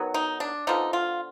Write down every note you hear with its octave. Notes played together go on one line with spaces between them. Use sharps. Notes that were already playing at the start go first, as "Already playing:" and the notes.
Already playing: D#3 F#3 B3
D#4
D4
D3 F3 B3 D#4
F4